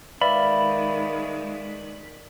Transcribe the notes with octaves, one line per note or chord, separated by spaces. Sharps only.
D#3 G#3 B4 D5 E5 F5 B5